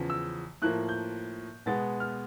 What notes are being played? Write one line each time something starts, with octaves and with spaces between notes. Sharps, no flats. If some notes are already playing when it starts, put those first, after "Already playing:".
Already playing: E2 C#3 F3
E6
A2 F3 A#3 F#6
G6
B2 G#3 B3 A6
F6